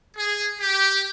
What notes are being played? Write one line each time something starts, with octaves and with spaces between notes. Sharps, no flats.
G#4
G4